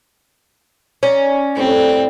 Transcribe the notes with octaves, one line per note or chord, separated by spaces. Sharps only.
C#4 D5 A#5
A2 G3 C4